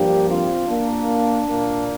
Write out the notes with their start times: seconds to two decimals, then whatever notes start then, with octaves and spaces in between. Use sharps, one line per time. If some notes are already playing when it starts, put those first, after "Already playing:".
Already playing: G2 F3 A#3 D4 G4
0.28 C4 F4
0.68 A#3 D4
1.47 A#2 A#3